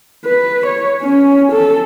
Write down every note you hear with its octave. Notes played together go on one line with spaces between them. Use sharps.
B4
C#5
C#4
A4